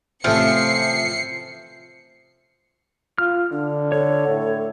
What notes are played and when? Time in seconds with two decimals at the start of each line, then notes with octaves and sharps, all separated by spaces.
0.24 C3 F3 A3 C#4 C7 C#7
3.18 F4 F6
3.52 D3 D4
3.92 A4 C#5
4.27 A2